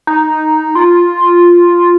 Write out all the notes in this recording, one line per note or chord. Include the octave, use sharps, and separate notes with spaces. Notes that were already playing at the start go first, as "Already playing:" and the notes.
D#4
F4